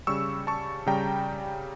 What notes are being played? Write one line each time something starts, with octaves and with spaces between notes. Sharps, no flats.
C#3 G3 C#6 E6
A5 C#6
C#3 G3 G5 A#5